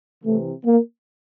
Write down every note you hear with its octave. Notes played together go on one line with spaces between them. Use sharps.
C3 E3 A3
A#3